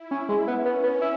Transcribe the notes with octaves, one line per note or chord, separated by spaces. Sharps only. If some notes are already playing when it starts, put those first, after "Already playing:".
Already playing: E4
C#4
G#3
B3 C#4
B3
B3
E4